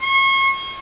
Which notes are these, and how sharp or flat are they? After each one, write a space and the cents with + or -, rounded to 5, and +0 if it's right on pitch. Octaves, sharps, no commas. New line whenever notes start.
C#6 -35